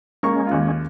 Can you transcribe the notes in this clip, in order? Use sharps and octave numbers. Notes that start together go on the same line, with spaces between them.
G#3 A#3 C#4 C#6
D#2 F4